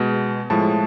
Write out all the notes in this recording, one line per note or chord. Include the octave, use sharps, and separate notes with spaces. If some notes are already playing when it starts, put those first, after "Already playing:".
Already playing: B2 G#3
A2 F3 G#3 A5